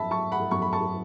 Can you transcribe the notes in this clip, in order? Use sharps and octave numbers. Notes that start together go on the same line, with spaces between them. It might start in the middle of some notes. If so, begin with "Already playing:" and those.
Already playing: F#2 E5 A5 B5
F#3 A5 C#6
F#5 B5
F#2 C#6
B5
A5 C#6